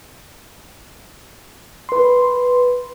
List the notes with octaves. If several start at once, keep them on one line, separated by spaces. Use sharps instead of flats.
B4 C6